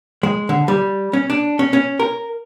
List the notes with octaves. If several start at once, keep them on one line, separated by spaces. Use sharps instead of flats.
G#3
D3
G3
C#4
D4
C#4
C#4
A#4